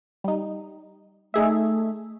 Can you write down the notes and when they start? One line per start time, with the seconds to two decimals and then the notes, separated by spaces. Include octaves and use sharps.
0.24 G3 D#4
1.34 A3 D#4 G#4 E5